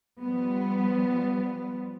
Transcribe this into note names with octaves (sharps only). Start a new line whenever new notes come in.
F3 G3 B3